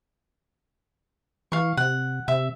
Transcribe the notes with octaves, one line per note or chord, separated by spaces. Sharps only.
E3 F5 C#6
C3 F#5
C3 E5